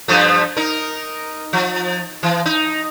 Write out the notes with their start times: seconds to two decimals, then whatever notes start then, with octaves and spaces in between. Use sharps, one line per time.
0.08 G2 F3 A3
0.56 D#4 A#4
1.53 F3
2.23 E3
2.46 D#4